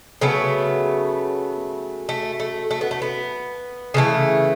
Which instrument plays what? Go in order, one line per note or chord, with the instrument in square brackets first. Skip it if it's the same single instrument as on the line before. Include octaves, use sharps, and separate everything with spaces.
[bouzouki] C#3 F#3 A3 B3
A3
A3
A3
B3
A3
B3
C#3 E3 A3